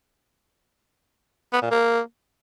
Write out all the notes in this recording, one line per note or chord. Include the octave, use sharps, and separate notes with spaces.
B3
A#2
A#3